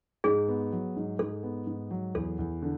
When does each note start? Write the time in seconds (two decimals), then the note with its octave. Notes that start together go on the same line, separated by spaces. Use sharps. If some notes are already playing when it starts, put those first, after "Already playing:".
0.24 G#2 G#4
0.48 B3
0.72 F#3
0.96 G#2
1.19 G#2 A4
1.43 B3
1.67 G#2
1.91 F#3
2.15 E2 A4
2.39 E2
2.62 D3